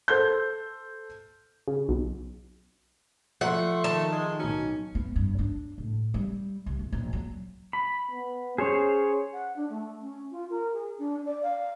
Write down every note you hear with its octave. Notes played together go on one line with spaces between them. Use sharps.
A4 C5 G6
C#3
B1
F3 A3 F#5 C6
D#3 A5
G#3
B1 C#4 D#4
B3
G2
D4
A2
G3
C2
G1
A#1
F#3
B5
B3
C#4 G#4 C5 C#5
F#5
D4
A3
C#4
F4
A#4
G#4
D4
D5
F5